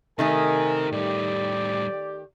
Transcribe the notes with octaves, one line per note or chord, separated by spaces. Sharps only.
C3 D#3 A3 D#4 G4 A#4 G#5
A2 G3 G4 D5